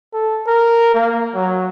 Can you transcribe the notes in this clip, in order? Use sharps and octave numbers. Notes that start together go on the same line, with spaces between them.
A4
A#4
A#3
F#3